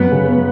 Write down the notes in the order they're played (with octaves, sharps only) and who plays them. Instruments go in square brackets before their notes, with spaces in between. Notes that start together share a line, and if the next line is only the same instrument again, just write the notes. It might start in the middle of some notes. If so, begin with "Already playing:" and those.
Already playing: [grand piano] F#2 [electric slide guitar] B3
[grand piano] C#3
F#3